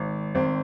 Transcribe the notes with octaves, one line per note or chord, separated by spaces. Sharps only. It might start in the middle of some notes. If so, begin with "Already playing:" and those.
Already playing: G#1
G#1 C4